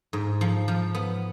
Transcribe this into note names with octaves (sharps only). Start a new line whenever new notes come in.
G#2
F3
F3
B3